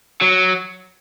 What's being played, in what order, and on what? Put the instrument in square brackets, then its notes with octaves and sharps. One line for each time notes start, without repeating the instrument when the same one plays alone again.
[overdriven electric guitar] F#3